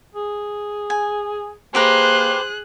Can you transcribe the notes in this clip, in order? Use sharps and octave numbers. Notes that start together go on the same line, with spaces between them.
G#4
G#5
A#3 G4 G#4 B4 C5 A#5 F#6